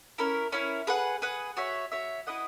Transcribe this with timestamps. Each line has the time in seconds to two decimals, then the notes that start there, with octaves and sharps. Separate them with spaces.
0.18 C#4 E4 A#4
0.52 C#4 E4 A#4
0.87 G#4 B4 F#5
1.22 G#4 B4 F#5
1.57 F#4 C#5 E5
1.92 F#4 C#5 E5
2.27 E4 B4 D#5 F#5